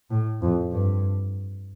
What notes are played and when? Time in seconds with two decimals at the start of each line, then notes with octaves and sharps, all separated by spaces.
0.10 A2
0.42 F2
0.72 G2